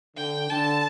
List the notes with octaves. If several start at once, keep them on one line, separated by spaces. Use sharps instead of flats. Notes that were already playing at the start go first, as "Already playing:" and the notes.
D3 G5
D3 A5